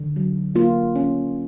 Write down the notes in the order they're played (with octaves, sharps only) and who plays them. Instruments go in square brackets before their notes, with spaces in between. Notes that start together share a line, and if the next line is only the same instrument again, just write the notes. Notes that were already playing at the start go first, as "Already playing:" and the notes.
Already playing: [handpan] D3
F#3
A#3 F4
C#4